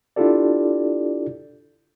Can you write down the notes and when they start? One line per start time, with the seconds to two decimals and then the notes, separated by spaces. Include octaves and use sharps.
0.16 D4 E4 F4 G4 A4 D5